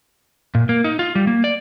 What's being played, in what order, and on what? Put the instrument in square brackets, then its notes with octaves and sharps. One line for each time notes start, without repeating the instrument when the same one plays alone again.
[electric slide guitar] A#2
A#3
D#4
F4
G3
A#3
D5